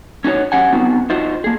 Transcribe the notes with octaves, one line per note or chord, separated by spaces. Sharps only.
C#4 D#4 F#4 C#5
C#4 G4 F#5 G#5
B3 C4 D#4 F#4
D#4 F4 F#4 C5 D#5
A#3 G#4